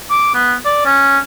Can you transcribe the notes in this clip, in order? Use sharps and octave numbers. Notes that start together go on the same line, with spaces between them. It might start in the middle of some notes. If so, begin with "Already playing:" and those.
D6
B3
D5
C#4